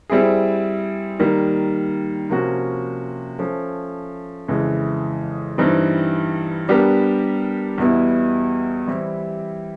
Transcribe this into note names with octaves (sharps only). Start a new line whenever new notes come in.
G3 C4 E4 G#4
D#3 G3 A#3
C3 F3 A#3 C#4 F#4
F3 A3 C#4
F2 C#3 E3 G#3
G2 E3 G3 C4 D#4
G3 B3 D4 G4 A#4
E2 B2 G3 B3 E4
E3 G3 C4 E4 G4